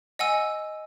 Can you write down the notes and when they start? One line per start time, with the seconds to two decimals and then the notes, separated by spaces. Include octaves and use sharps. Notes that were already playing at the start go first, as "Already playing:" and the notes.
0.19 D#5 F#5 G#5 E6